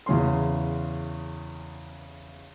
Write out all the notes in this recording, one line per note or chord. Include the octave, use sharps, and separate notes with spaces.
E2 C#3 C#4 C6